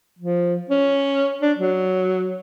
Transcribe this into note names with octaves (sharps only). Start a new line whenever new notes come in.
F3
C#4
D4
F#3